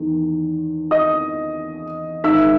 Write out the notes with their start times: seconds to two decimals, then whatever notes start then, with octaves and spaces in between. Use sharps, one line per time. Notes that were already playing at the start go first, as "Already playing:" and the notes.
Already playing: E2 D#3
0.91 D#5 D#6
2.24 G#2 D#3 E5 E6